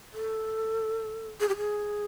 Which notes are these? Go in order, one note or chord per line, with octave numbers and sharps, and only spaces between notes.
A4
G#4
G4
G#4